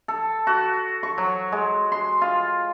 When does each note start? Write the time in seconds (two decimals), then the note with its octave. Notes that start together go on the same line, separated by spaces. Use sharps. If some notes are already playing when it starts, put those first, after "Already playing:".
0.08 A4
0.47 F#4
1.03 C#6
1.18 F#3
1.52 G#3
1.92 C6
2.21 F4